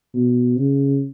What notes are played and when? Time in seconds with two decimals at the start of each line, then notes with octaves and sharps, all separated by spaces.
0.14 B2
0.57 C#3